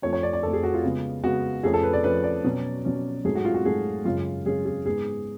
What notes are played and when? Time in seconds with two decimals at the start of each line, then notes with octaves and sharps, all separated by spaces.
0.02 F2 F3 A3 C#5
0.13 C#5
0.23 D5
0.33 D5
0.43 F2 F3 A3 A4
0.53 G#4
0.63 F#4
0.74 F4
0.83 C#3 G#3 B3
1.23 C#3 G#3 B3 F#4
1.63 F2 F3 A3 C#4 G#4
1.74 A4
1.83 B4
1.93 D5
2.04 F2 F3 A3 C#4 B4
2.24 D5
2.44 B2 F#3 C#4
2.85 B2 F#3 C#4
3.25 G#2 F#3 A3 G#4
3.35 F#4
3.45 F4
3.54 F#4
3.65 G#2 F#3 A3 G#4
4.05 F#2 C#3 G#3 C#4 F4
4.46 F#2 C#3 G#3 C#4 G#4
4.65 G#4
4.85 G#2 G#3 B3 G#4